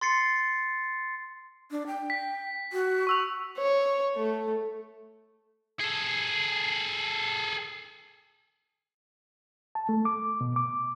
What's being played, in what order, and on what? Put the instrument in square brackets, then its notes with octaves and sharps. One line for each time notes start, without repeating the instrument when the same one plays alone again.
[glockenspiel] C6 A6 C7 C#7
[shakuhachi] D4
G5
[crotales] B6
[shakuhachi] F#4
[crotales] C#6 E6 F7
[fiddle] C#5
A3
[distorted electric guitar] G#4 A4
[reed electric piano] A5
A3
D6
B2
D6